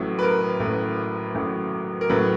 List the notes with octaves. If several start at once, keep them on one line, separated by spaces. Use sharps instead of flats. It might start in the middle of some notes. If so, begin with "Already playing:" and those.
Already playing: A1 A2 F#3
B4
A#4
A1 A2 F#3
A1 A2 F#3
A#4
A1 A2 F#3 B4